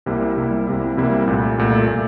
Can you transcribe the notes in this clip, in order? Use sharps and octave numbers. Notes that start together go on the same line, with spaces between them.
C2 C3 G3 A#3 E4
C2 C3 G3 A#3 E4
C2 C3 G3 A#3 E4
C2 C3 G3 A#3 E4
C2 A#2 A3
C2 A#2 A3
A#2 A3